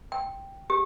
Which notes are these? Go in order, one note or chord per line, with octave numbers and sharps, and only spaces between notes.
G5
G4